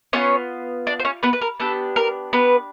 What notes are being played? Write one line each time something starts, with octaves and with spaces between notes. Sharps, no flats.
B3 C#4 F4 C#5
D4 D5
C5
C#4 C#5
B3 B4
B4
A#4
B3 D4 G4 A4
A#4
B3 B4